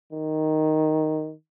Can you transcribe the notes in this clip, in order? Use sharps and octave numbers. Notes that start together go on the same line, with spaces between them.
D#3